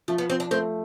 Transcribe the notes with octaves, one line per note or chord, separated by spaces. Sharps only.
F3 A3
B3
F3 C4
D4
A3 C4